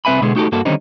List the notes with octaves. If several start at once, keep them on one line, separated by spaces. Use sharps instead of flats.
C2 C4 B4 E5 G#5 B5
B2 D3 G#3 B3 G#4
A3 D#4 F#4 G4 A4
G2 A#3 F#4 A4
D3 D#3 G3 C4 C#4 D#4